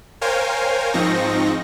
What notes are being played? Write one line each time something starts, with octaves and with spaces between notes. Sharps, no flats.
A#4 C5 C#5 F5 G5 G#5
G#2 F3 C4 D#4 C#6 A#6